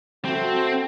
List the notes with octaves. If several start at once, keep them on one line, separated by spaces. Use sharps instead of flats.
A3 C4 F#4